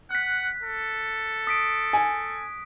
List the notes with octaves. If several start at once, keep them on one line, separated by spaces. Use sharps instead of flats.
F#5 F#6 B6
A4
D#6 B6 D7
G#5